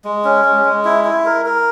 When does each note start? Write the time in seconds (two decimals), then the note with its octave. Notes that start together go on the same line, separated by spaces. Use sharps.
0.04 G#3
0.24 C#4
0.45 G#3
0.65 G#3
0.85 E4
1.05 E4
1.26 A#4
1.45 A#4